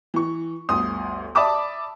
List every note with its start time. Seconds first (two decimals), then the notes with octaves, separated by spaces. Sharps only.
0.14 E3 C#6
0.69 G1 D2 C6 D#6
1.35 D5 E5 A5 B5 D6 D#6